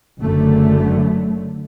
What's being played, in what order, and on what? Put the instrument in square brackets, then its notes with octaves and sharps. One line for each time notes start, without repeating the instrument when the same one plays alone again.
[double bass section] F#1 F#2 D3 A3